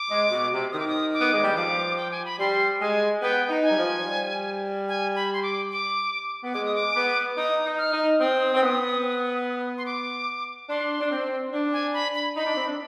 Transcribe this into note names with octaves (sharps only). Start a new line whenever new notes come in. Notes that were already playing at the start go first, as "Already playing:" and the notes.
Already playing: D6
G#3
B2
C3
D#3 D#6
D6
D#6
D6
B3
G#3
G3
F3 D6
G5
G#5
B5
G3 C6
G#3 G#5
B3 G5
D#4
G#5
G3
F3
G3
G#5
B5
C6
D6
D6
B3
G#3 D6
D#6
D6
B3
D#4 D#6
D#4
F6
D#4
C4 D#6
C4
B3
C6
D6
D4 C6
D4
C4
D4
G#5
B5
B5
D#4 B5
D4
C4
D4